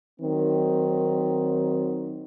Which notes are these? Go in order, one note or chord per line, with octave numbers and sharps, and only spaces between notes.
D#3 F#3 C4